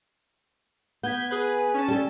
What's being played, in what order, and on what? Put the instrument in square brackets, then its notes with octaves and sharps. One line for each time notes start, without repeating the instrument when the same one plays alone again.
[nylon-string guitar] B3 [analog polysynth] G6 G#6 B6
[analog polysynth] G#4 B4
C#4 A5
[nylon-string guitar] G3 A4